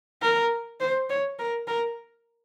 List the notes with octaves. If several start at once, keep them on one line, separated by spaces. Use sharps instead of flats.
A#4
C5
C#5
A#4
A#4